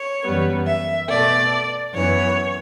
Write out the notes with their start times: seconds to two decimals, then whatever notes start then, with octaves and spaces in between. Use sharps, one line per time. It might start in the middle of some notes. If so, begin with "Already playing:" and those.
Already playing: C#5
0.23 F#2 E3 G3 B3
0.66 E5
1.08 B2 A3 D5
1.94 F#2 E3 B3 C#5